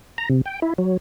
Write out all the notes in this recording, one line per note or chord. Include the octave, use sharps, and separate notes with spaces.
A#5
C3
G5
E4
F#3